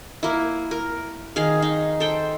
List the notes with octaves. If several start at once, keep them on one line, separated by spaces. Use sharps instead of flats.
A#3 E4
A#4
D#3 G#4 F5
D#4
A4 C5 G5